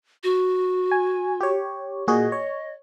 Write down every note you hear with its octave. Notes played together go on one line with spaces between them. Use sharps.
F#4
G#5
G4 C#5
A#2 F#4 G#4 D#5
C#5